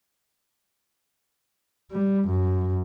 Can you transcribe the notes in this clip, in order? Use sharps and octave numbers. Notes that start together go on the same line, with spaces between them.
G3
F#2